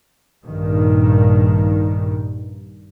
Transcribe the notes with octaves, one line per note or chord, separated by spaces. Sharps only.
A#1 G2 D#3